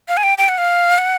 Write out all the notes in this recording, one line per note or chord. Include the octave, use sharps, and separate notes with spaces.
F5
G#5
G5
G5
F#5
F5
F#5